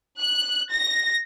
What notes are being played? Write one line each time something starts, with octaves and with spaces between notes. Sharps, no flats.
F#6
A#6